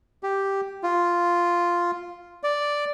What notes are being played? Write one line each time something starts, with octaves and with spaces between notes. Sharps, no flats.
G4
F4
D5